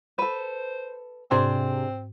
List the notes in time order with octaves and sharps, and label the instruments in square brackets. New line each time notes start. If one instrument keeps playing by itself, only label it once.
[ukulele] A4 B4 [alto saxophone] C5
[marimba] G#2 C6 [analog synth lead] C3 [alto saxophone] C4 [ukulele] D4 G#4 C5